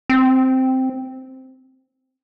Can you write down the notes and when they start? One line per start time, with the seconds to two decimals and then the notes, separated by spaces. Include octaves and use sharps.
0.10 C4